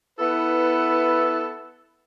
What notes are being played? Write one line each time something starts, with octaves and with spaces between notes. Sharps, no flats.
B3 E4 A4 B4